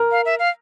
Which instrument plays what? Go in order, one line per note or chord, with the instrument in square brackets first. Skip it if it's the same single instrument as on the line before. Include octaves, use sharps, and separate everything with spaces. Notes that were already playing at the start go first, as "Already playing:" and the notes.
Already playing: [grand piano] A#4 A#5
[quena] F5
E5
F5